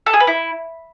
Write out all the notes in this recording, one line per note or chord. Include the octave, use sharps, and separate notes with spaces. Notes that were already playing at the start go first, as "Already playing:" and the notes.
A4
G#4
B4
E4